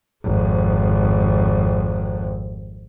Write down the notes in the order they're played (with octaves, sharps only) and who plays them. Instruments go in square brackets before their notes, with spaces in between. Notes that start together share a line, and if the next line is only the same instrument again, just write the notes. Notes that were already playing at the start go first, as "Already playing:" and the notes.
[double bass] G#1 F2